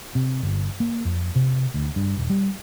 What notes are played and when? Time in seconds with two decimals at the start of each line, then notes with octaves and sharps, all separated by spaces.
0.15 C3
0.43 G1
0.80 A#3
1.05 F2
1.36 C3
1.74 D2
1.96 G2
2.17 D#1
2.30 G3